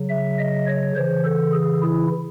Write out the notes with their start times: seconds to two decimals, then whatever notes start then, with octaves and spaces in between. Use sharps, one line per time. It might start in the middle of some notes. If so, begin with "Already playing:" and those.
Already playing: C#3 F#3
0.09 E5
0.38 D#5
0.67 C#5
0.96 C#3 E3 C5
1.24 A4
1.53 G#4
1.82 E4